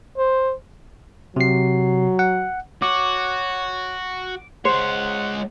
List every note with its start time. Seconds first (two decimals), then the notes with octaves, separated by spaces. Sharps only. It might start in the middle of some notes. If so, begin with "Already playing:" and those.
0.18 C5
1.36 C3 F#3 C7
2.19 F#5
2.82 F#4 C#5 D6
4.65 G#3 C5 C#5 F#5